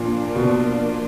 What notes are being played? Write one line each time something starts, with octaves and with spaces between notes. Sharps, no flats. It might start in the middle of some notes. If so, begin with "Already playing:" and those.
Already playing: A#2 F3 A#3 D4 F4
B2